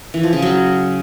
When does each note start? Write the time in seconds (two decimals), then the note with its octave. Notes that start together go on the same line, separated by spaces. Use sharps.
0.14 E3
0.23 F3
0.33 C#3
0.42 F#3